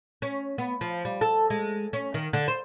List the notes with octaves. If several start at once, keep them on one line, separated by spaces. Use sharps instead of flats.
C#4
B3
F3
G3
A4
G#3
C#4
D#3
D3
C5